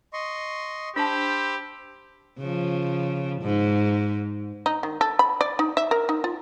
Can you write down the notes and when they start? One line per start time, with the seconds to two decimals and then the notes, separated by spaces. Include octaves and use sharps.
0.13 D#5 C6 C#6
0.96 D4 G4 C5 A5 B5 E6
2.39 C#3 F3
3.42 G#2
4.66 D#4
4.83 D#3
5.01 A4
5.19 B5
5.41 D5
5.59 D#4
5.77 E5
5.91 A#4
6.09 D#4
6.24 F4